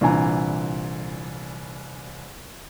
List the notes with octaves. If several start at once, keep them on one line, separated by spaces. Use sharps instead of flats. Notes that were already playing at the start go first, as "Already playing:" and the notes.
C2 A#2 D3 E3 G#5 A#5